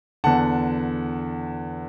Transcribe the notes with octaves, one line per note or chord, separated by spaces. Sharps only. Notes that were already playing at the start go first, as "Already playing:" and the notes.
E2 D3 F#5 A5